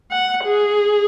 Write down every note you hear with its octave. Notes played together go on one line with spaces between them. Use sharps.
F#5
G#4